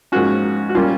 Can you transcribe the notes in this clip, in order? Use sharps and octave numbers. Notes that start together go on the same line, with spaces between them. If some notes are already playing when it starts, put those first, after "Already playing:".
G#2 F3 A#3 C#4 F#4
F#4
A#2 G3 A#3 C#4 F4